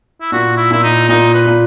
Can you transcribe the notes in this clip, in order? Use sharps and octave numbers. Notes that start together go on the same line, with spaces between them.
E4
A#2 F#4
E4
A#2 E4
D#4
A#2 D#4
B4
A#2